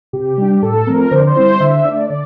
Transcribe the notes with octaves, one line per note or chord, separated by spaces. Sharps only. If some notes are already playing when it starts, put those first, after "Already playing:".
C3 G4
G3 D4
A2 A4
F3 A3 C4 A#4
D3 C5
D5
C5
G3 C4 E4
D3 E5
A3 D4 D5
D3 D5